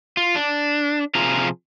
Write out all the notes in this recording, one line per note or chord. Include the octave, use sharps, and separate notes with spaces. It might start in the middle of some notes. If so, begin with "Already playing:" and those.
F4
D4
C3 F3 F4 G#4 A#5